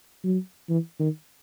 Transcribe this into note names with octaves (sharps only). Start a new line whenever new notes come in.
F#3
E3
D#3